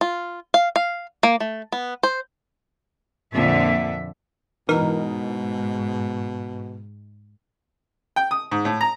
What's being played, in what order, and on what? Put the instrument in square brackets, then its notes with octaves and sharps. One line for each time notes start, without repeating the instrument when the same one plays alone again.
[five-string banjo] F4
F5
F5
A#3
A3
B3
C5
[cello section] F2 A#2 D3 E5
[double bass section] G#2 [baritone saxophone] B2 [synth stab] E3 D#4 A#4
[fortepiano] G5
D#6
G#2
A2
A#5